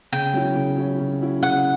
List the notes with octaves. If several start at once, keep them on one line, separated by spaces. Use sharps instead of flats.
C#3 G5
F#3 C#4 E4
C#3
F#3 C#4 E4
C#3
F#3 C#4 E4
C#3 F#5